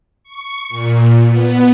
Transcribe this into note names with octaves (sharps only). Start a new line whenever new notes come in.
C#6
A#2
B3